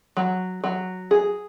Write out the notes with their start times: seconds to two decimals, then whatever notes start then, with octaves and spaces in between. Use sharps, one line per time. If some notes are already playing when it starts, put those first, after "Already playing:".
0.17 F#3
0.64 F#3
1.11 G#4